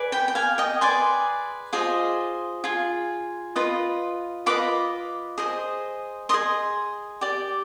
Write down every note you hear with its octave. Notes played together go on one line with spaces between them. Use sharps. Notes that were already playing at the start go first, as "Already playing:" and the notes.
Already playing: G#4 B4 D5
G5 B5
G5
F5 G#5
D#5 G5
G#4 B4 D5 G#5 C6
F4 G#4 C5 D#5
F4 G#4
F4 B4 D#5
F4 B4 D#5 B5 D6
G#4 C5 D#5
G#4 C5 D#5 C6 D#6
G4 D5